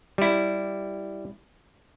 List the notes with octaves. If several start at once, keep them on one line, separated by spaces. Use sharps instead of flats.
G3 E4